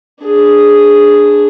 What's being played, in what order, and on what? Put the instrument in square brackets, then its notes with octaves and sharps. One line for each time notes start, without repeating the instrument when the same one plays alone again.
[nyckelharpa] D4 G#4